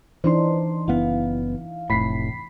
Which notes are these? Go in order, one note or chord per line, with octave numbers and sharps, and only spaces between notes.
E3 D4 D#4 C5 C6
F#1 B3 E4 F5
F1 A2 B5 B6 C7